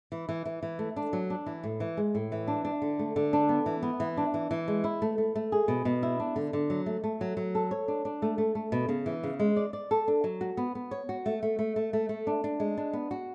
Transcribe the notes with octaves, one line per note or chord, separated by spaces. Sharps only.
E3
E3
E3
E3
A3
D4
F#3
D4
E3
A2
E3
G#3
A2
E3
D4
D4
D3
A3
D3
D4
B3
E3
B3
E3
D4
E3
E3
G#3
E4
A3
A3
A3
G#4
B2
B2
E4
D4
D3
D3
F#3
A3
A3
F#3
F#3
A4
C#5
D4
D4
A3
A3
A3
B2
C#3
E3
C#3
G#3
D5
D5
A4
D4
F#3
F#4
B3
B3
C#5
F#4
A3
A3
A3
A3
A3
A3
D4
D4
G#3
D4
B3
F#4